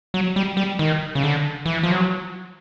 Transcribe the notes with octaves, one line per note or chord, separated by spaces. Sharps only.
F#3
G3
G3
D#3
C#3
D3
E3
F3
F#3